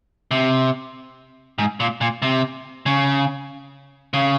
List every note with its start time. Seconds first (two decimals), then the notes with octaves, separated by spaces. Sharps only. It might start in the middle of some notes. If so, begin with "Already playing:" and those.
0.31 C3
1.58 G#2
1.80 A#2
2.01 A#2
2.22 C3
2.86 C#3
4.14 C#3